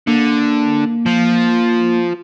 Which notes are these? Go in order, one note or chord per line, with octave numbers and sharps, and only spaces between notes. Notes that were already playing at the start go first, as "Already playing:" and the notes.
D3 A#3
F3